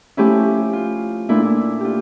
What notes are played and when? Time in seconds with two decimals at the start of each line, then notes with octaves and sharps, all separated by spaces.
0.17 F3 A3 C#4 E4 G4
0.73 F4
1.29 A#2 A3 D4 E4
1.44 E4
1.80 F4 G4